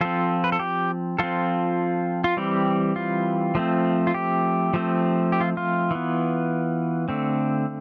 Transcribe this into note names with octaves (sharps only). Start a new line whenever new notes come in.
F3 C4 F4 A4
B4
A4
G4
F3 C4 F4 A4
F4
E3 G3 C4 G4
F4
F3 A3 C4
F4
G4
F3 A3 C4
G4
F4
F4
E3 B3
D3 A3 C4